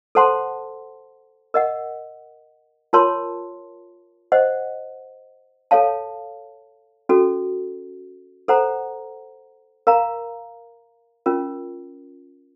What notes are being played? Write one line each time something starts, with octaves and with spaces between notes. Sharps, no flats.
A4 C5 F#5 A5 C6
A#4 D#5 F#5
F4 A#4 C#5 A5 C6
C5 D#5 F#5
A4 C#5 F5 A5
C#4 F#4 A4
A4 C5 F#5 A#5
A#4 F5 A#5
C#4 F4 A#4